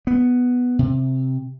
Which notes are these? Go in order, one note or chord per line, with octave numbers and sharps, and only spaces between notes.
B3
C3